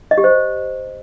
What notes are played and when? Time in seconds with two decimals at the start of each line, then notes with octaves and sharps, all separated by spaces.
0.11 D#5
0.18 G4
0.24 C5